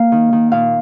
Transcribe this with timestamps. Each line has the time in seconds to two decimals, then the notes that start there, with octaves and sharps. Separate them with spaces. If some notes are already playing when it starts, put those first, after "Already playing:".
Already playing: A#3 F5
0.12 D#3
0.33 D#3
0.52 A#2 F5